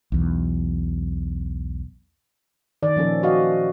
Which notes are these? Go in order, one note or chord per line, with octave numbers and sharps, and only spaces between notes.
B1 E2
D#3 D5
A#2 F3 C#4 A4
F#4 D#5 F5